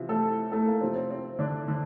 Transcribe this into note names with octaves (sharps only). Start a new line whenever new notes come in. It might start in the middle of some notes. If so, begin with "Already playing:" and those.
Already playing: C3 E3 F3 E4
A3 A4
A3 A4
A#3
C3 F3 C4
C4
C4
D3 D4
D3 D4